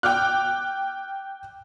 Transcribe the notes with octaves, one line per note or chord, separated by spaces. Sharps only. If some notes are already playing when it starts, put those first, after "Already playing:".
G5 D6 F6 F#6